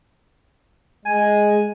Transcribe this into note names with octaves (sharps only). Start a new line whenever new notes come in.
G#3 G#5